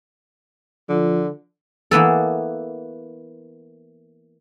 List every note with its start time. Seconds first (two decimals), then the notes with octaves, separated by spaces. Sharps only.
0.89 D3 F3
1.91 E3 A#3 B3 A4